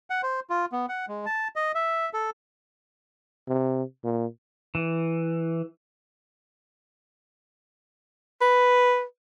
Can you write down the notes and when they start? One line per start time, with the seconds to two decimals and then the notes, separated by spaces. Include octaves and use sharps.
0.10 F#5
0.23 C5
0.50 F4
0.72 B3
0.89 F#5
1.08 G#3
1.26 A5
1.56 D#5
1.75 E5
2.13 A4
3.48 C3
4.04 A#2
4.75 E3
8.41 B4